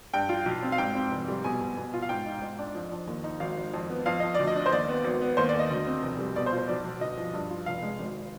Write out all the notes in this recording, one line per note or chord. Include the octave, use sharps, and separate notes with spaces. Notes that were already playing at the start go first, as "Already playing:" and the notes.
G2 G5
F4
B1
C4
F5
G#2 G5
C4
F1
G3
B2 G#5
B2
B2
F4
F5
G#2 G5
D#4
G#2
D4
F2
F2
D#2
D#4
G#1 F5
G#1
F2
B3
F2 F5
F2 D#5
D2 D5
D#5
D4
C5
D#2 D5
B3
G#1
B3
D#2 C5
D5
D#2 D#5
D2
C4
F1
G3
B2 D5
C5
F4
C5
B1 D5
B1
G1 D#5
F3
G2
F4
F1 F5
G#3
G#1